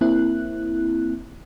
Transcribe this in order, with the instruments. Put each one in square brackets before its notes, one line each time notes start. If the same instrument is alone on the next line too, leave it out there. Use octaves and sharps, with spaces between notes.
[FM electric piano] A#3 C4 E4 F#6